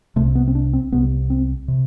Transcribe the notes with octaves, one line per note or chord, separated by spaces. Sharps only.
C2 C3 A3
B3
C4
D4
C4
C2 C3 B3
C4
C3